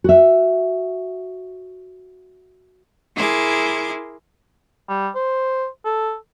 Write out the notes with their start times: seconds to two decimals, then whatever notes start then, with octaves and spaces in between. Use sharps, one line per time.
0.04 F#4 E5
3.16 E4 G#4 A#4 C6 D6 G#6
4.89 G3
5.15 C5
5.85 A4